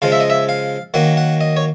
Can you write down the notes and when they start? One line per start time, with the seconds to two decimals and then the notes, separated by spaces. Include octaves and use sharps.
0.02 C#3 F3 G#3 F5
0.12 E5
0.20 D#5
0.30 E5
0.49 F5
0.94 D#3 F#3 A#3 F#5
1.17 F#5
1.41 D#5
1.57 C#5